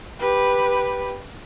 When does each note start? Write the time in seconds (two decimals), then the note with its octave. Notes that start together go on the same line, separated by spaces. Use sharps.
0.19 G4 B4